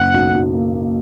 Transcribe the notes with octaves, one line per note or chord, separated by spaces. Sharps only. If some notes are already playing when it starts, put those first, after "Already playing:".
Already playing: F#1 F#5
B1
B1
A#3
A#3